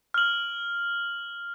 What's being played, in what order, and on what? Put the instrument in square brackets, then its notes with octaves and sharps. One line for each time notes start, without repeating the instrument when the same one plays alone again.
[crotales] F6 F#7